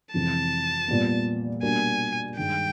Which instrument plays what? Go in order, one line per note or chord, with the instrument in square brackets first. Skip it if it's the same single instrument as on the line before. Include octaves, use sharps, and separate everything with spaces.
[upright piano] F2 C3 E3 G#3 C4 [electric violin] A5
[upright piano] A#2 G3 B3
[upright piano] B2 G3 A#3 D4 F#4 [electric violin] G#5
[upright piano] G2 D#3 G#3 [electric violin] G5